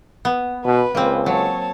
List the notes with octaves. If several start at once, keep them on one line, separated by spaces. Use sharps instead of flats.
B3
B2 B4
C#2 A#3 C4
F#3 C#5 A5